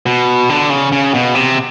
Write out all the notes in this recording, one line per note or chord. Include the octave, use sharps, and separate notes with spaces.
B2
D3
C#3
C#3
B2
C3